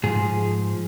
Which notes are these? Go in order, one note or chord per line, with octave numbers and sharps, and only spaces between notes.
G#2 F3 G#4